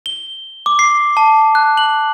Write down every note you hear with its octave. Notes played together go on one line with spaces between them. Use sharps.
G7
D6
C7
A5
F#6
F#7